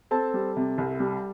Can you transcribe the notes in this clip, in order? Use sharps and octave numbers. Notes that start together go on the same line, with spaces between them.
C4 A4 A5
G3
C3
C2
G3